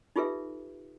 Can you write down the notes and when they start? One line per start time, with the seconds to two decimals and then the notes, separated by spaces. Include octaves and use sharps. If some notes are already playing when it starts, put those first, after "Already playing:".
0.16 D#4 F4 G4 A4 B4 E5